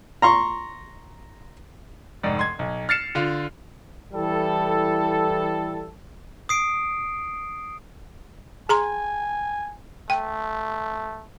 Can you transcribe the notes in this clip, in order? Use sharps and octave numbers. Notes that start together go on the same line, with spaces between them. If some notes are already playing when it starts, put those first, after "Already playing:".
A#5 C6 C#6
F1 G#2 D5
C6 G#6
B1
F6 A6 C7 C#7 E7
D3 F4
E3 G3 E4 A4
D#6 C7 D7
G#4 G#5 A#5 C6
A3 G5